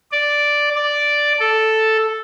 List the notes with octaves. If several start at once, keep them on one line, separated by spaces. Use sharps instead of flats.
D5
D5
A4